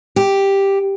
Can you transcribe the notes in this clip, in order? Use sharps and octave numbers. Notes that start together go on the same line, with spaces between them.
G4